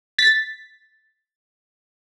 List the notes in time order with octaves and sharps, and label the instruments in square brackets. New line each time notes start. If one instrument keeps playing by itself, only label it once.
[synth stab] A6 B6